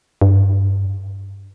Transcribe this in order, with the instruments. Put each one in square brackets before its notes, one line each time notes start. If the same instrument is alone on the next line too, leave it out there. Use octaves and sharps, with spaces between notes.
[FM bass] G2